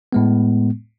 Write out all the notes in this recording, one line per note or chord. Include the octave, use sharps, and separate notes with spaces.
A2 G#3 B3